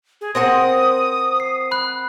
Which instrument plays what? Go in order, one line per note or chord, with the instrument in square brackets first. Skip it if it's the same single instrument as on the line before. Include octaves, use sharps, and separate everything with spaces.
[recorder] G#4
[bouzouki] C4 A#4 F#5 [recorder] D#6
[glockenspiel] C7
B5 F#6